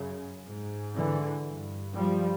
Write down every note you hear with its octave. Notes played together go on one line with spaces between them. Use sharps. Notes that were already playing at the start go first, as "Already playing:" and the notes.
Already playing: F#2 C#3
G#2
D3 E3
G2
F3 G3